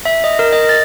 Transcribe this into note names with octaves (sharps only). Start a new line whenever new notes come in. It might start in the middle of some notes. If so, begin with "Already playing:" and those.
E5
D#5
A#4
D#5
A6